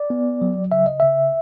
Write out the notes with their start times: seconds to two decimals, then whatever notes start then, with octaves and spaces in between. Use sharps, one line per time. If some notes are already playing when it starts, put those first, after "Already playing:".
Already playing: D5
0.10 B3
0.42 F#3
0.72 C#3 E5
0.86 D#5
1.00 C#3 E5